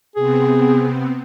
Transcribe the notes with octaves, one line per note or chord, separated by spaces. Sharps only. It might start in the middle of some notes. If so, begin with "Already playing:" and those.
C3 B3 C4 G#4